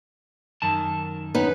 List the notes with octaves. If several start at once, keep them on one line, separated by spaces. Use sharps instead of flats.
F#2 D#3 A5
B3 C#4 D#4 B4